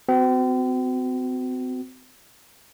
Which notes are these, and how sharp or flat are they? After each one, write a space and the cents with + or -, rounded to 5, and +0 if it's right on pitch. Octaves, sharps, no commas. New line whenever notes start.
C4 -40 F#4 +0